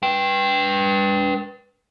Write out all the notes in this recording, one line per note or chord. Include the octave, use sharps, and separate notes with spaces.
B4 G5